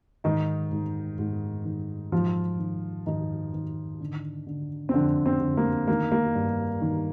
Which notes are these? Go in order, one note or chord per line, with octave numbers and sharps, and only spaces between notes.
G#2 D#3 D#4
G#2
G#2
D#3
G#2 F3 F4
D#3
G#2 D#3 D#4
D#3
D3
D3
C4
F2 D3 D4
C4
D3
A#3
D#3 A#3
A#3
G2
D#3